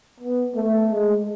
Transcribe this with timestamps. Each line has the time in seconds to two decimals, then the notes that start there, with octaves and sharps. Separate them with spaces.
0.20 B3
0.56 A3
0.91 G#3